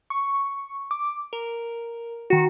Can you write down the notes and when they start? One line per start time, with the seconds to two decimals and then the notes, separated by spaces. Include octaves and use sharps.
0.10 C#6
0.91 D6
1.33 A#4
2.30 D#3 F#4